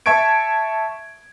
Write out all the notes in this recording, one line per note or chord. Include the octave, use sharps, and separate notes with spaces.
E5 A5 C#6 G#6 D7